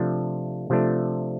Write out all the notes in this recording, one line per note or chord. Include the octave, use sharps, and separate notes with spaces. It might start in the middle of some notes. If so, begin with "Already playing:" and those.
Already playing: C3 F3 A3 D4
C3 F3 A3 D4